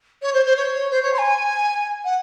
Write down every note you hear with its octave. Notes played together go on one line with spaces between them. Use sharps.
C#5
C5
C5
C#5
C5
C#5
C6
G#5
F#5